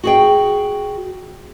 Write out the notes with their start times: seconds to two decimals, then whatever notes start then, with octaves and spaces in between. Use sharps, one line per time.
0.03 F#4 G#4 G5